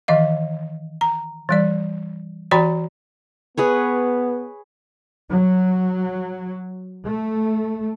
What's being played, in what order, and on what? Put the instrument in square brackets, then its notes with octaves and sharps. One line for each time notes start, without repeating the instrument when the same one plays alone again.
[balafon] D#3 E3 D#5 F5
A#5
E3 G3 D5
E3 F#4 D5 G5 A#5 B5
[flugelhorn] B3 [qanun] G#4 B4 C#5
[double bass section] F#3
A3